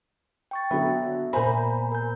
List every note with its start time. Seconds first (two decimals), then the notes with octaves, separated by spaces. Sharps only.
0.51 G5 C#6 A6
0.71 D3 F#3 B3 E5
1.33 A#2 C5 G#5 A#5 B5
1.92 A#4 G6